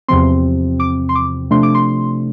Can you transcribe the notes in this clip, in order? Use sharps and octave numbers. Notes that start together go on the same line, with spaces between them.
E2 C3 F3 C4 C6
D6
C6
D6
C3 F3 A3 D4 C6
D6
C6